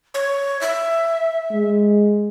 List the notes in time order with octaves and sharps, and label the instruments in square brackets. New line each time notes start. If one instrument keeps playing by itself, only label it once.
[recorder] C#5
E5
[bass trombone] G#3